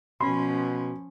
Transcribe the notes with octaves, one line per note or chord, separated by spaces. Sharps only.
B2 F3 C#4 B5 C6